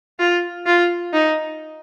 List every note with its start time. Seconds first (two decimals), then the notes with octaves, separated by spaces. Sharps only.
0.19 F4
0.66 F4
1.13 D#4